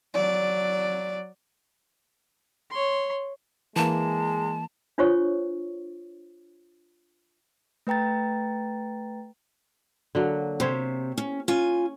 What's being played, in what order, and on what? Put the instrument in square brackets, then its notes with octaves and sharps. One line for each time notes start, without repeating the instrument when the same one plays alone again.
[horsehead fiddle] F#3 D5
[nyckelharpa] C#5 C6
[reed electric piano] E3 A#3 [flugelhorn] G#3 [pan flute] A5
[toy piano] D4 F4 C5 C#5 C#6
[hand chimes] A3 B4 G5 A#5 A6
[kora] D3 F#3 A#3
[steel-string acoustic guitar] C3 [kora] G4 C5 C#5
[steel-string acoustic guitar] C#4
[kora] C#4 [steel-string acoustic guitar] F4 G#5